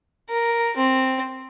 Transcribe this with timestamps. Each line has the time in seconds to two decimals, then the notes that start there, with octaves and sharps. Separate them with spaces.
0.29 A#4
0.76 C4